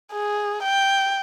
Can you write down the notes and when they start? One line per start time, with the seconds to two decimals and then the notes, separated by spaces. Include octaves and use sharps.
0.12 G#4
0.63 G5